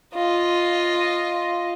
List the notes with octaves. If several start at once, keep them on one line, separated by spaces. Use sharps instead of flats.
F4 D#5